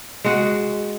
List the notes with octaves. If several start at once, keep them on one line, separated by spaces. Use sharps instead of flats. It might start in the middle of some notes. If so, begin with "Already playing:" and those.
G#3 F#4